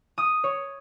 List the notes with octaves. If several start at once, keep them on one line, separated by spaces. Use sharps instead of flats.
D#6
C#5